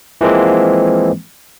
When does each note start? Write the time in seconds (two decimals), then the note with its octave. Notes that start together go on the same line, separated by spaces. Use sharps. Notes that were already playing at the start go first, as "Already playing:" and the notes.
0.21 E3 F3 G#3 A#3 C4